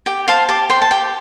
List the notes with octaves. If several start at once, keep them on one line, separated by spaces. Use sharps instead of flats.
G4 G5
C5 F5 A5
G4 A5 D6
C5 G5 C6
A5
G4 G5